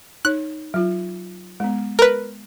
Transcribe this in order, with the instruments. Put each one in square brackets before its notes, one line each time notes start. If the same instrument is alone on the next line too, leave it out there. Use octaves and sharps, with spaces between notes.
[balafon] D#4 C#5 [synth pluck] F#6
[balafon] F#3 F4
G#3 B3
[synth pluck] A#4 B4